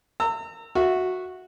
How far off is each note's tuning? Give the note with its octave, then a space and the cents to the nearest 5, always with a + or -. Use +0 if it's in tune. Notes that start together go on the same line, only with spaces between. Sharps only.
A#5 -40 E6 +0
F#4 -10 E5 +0